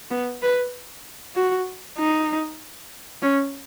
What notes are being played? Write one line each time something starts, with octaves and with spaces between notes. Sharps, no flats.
B3
B4
F#4
D#4
C#4